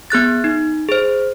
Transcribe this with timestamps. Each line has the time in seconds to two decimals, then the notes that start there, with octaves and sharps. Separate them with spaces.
0.10 B3 G#4 F#6 A6
0.44 D#4
0.89 G#4 C5